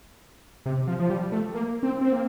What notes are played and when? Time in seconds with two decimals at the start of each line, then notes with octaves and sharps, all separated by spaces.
0.66 C3
0.87 F3
0.99 F3
1.10 G3
1.32 A3
1.54 A#3
1.83 C4
2.01 C4
2.13 A#3